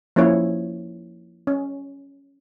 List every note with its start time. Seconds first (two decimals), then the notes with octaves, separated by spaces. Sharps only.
0.16 F3 A#3 C#4 E4 C#5
1.47 C#4